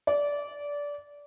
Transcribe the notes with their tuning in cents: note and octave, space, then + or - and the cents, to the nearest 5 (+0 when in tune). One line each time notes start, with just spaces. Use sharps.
D5 -20